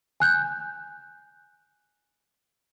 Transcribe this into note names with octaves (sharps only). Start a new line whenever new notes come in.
G#5 F#6 G6